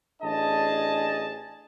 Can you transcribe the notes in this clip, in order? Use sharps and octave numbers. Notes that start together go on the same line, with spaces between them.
A1 D4 G#4 D#5 A5